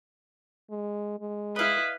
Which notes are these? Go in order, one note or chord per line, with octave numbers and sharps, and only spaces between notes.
G#3
G#3
E4 B4 D#5 F5